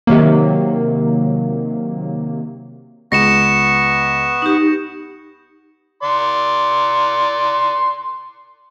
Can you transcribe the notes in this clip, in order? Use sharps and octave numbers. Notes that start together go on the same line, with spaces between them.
C3 D#3 F#3 A#3
C#2 B3 C#6 A#6 C#7 E7
D#4 G4
D5 C6